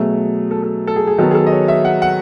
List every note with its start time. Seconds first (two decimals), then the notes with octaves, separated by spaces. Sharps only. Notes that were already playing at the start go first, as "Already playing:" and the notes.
Already playing: B2 F#3 A3 G#4
0.51 A4
0.63 A4
0.87 A4
0.96 G#4
1.07 G#4
1.18 D#3 F#3 B3 A4
1.31 G#4
1.35 A4
1.47 D#5
1.52 C#5
1.68 E5
1.85 F#5
2.02 F#5